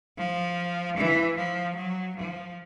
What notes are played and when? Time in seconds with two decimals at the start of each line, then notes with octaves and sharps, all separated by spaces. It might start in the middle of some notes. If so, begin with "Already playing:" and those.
0.18 F3
0.97 E3
1.36 F3
1.76 F#3
2.17 F3